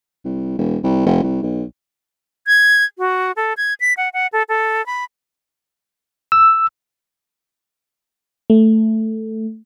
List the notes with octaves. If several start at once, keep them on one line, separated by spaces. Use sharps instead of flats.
C2
E1
C2
F1
C2
B1
G#6
F#4
A4
G#6
B6
F#5
F#5
A4
A4
B5
E6
A3